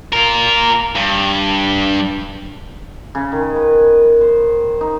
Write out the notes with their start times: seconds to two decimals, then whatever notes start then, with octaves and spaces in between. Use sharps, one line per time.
0.12 F4 A#4
0.95 G2
3.15 C#3
3.32 D#3
3.56 B4
4.21 C5
4.81 D#4